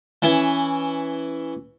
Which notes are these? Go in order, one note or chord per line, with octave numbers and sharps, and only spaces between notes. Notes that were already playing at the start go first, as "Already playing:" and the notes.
E3 C#4 E4